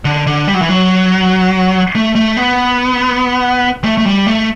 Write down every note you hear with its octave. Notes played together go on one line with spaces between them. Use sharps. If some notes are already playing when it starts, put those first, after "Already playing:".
D3
D3
G3
F#3
E3
F#3
A3
A3
B3
A3
A3
G3
A3